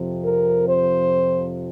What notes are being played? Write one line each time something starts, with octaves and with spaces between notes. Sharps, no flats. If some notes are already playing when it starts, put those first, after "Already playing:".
Already playing: F2 C3 F3
A#4
C5